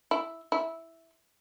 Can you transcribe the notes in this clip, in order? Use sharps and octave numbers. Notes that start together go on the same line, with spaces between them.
E4
E4